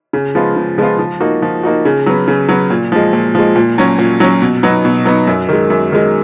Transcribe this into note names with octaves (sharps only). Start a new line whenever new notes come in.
C#3
F3 G#3 B3 F4
C#3
F3 G#3 B3 F4
F3
A#3 D#4 F#4
F3
A#3 D#4 F#4
C#3
F#3 B3
C#3
F#3 B3
A#2
F3 G#3
A#2
F3 G#3
A#2
F#3 C#4
A#2
F#3 C#4
B2
F#3 B3 D#4
B2
F#3 B3 D#4
F#2
D#3 G#3
F#2
D#3 G#3